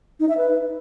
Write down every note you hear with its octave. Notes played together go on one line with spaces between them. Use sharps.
D#4
E5
B4